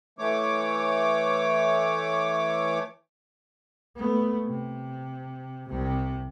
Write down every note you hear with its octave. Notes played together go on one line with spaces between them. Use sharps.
E3 A3 C#5 D6
A3 B3
C3
C2 C3